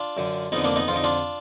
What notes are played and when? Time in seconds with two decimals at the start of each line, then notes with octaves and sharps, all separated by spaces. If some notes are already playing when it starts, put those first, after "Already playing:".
Already playing: D4 F4
0.17 F#2 D3
0.52 F2 D3 B3 D#4
0.64 A#3 D4
0.76 B3 D#4
0.88 F2 F4
0.92 D3 D#4
1.04 D4 F4